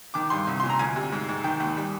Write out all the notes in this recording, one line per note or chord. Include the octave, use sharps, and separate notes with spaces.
D#3 D6
G2 C6
C2
A#2 C6
A#5
D2 G#5
C3
G#2
G#2
D#3 G5
D#2
G3